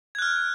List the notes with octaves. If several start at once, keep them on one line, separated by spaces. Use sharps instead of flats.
F6 F#6 G#6